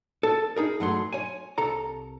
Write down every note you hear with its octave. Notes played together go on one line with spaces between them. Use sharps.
A4
D#4 G#4 A#4
G2 F#3 A3 G#4 C6
C#5 G#5
C2 A4 A#5